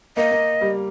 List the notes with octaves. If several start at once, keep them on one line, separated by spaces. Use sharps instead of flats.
A#3 D#5
A#3
G3